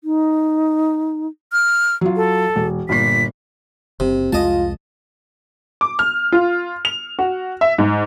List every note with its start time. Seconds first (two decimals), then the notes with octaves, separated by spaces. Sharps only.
0.04 D#4
1.52 F6
2.01 F#3 F4
2.16 A4
2.56 E1
2.89 G1 A#2 B6 C7
4.00 F#1 C3
4.33 C2 F2 G#3 F4 D#5 A5
5.81 D6
5.99 F6
6.32 F4
6.85 F7
7.19 F#4
7.61 E5
7.78 G#2